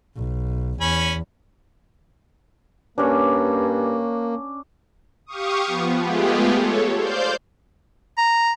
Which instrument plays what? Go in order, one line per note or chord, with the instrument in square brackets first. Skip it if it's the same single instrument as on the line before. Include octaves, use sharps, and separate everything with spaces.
[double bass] B1
[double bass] E2 [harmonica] C#4 G#5 B5
[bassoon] G2 [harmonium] A#3 [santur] C#4 D4
[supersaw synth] G4 F5 C#6 D#6
F3 B3
G#3 A3 B3 F4 G4 G#4
A4 C#5
C5 D5 F5 G6
[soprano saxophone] A#5